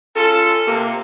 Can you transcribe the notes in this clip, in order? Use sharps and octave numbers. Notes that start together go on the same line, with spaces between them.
C#4 F4 A4
C3 A#3